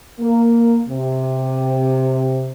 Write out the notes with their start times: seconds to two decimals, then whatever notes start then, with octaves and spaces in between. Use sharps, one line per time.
0.19 A#3
0.88 C3